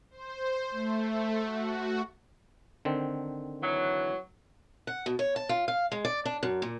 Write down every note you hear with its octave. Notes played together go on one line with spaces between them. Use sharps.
C5
A3
F#4
D3 D#3 C4
E3 F#3
F#5
B2
C#5
A5
F4
F5
G#3
D5
D4
F#2
A#2